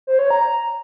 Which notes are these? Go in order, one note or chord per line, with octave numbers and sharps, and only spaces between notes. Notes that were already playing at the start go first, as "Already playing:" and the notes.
C5
C#5
A#5